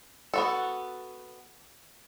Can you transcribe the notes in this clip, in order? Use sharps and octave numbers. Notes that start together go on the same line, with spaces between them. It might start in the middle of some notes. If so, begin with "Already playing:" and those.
B3 F#4 A4